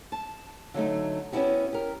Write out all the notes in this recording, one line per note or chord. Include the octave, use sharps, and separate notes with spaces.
A5
D3 F#3 A3 D#4
B3 C#4 D4 E4 F#4 G4
G4 A#4